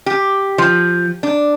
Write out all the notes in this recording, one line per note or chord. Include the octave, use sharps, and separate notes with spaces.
G4
F3
D4